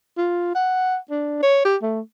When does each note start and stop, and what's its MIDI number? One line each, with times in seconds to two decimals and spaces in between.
0.18 0.52 65
0.55 0.97 78
1.11 1.40 62
1.43 1.62 73
1.65 1.76 67
1.82 2.00 57